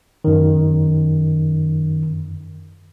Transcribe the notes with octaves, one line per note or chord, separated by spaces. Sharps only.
F#2 D#3